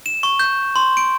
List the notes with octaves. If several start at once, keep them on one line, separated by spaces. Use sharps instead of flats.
E7
C#6
G6
C6
D7